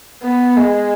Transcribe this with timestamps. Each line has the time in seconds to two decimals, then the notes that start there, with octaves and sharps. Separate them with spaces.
0.23 B3
0.57 G#3